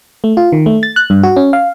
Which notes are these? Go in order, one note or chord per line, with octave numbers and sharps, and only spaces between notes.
A3
F4
D#3
A3
A6
F#6
G2
F#4
C#4
F5